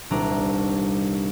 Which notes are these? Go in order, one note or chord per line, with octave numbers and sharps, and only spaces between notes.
D#1 C2 D4 A#5